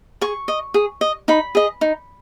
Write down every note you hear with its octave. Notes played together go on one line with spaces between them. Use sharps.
G#4 C#6
D#5
G#4
D#5
D#4 B5
G#4 D#5
D#4